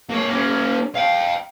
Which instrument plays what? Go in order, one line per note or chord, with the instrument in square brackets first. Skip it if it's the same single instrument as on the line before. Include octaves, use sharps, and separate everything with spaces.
[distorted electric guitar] A#3 C#5
A#3 C#4
F5 G5